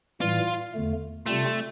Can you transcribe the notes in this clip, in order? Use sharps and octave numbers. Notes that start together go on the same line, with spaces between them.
A2 E3 G3 F4
E2 D3 A3
C3 G3 A3 C4 F4